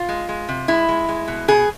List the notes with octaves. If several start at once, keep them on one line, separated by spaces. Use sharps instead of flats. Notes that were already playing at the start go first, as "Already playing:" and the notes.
Already playing: F4
G#3
G#3
C3
G#3 E4
G#3
G#3
B2
B2 G#4